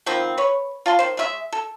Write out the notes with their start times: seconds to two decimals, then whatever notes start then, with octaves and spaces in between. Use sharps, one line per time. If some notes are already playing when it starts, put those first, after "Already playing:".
0.06 D#3 F3 B3 C4
0.38 B4 C#5
0.86 F4 A5 C6
0.99 D#3 C5
1.17 G#3 F4 E5
1.52 A4